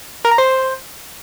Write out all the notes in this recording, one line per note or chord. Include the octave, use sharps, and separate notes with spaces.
A#4
A#5
C5